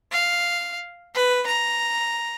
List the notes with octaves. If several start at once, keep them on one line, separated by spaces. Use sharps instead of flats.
F5
B4
A#5